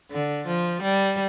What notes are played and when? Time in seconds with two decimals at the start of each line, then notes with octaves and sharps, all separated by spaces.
0.11 D3
0.47 F3
0.82 G3